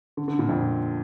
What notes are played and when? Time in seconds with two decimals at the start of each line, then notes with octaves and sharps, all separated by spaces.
0.17 D3
0.28 D3
0.39 A#2
0.49 F2